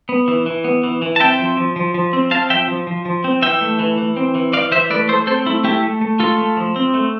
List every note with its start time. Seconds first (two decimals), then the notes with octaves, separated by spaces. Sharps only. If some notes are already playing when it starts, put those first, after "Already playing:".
0.09 B3
0.28 E3
0.46 E3
0.64 B3
0.83 E3
1.02 E3
1.16 A5
1.20 C4 E5 G5
1.39 F3
1.57 F3
1.76 F3
1.94 F3
2.13 C4
2.31 C4 F5 A5
2.50 F3 E5 G5
2.68 F3
2.87 F3
3.05 F3
3.24 C4
3.42 E3 E5 G5
3.61 A3
3.79 E3
3.98 E3
4.17 C4
4.35 E3
4.53 E3 D5 F5
4.72 E3 C5 E5
4.90 A3 B4 D5
5.09 A3 A4 C5
5.27 C4 A4 C5
5.46 A3 E4
5.64 A3 E4 G4
5.83 A3
6.01 A3
6.20 A3 F4 A4
6.38 A3
6.57 F3
6.76 C4
6.94 A3